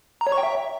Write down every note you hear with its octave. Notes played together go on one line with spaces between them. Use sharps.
A#5
C#5
C#6
G5
E5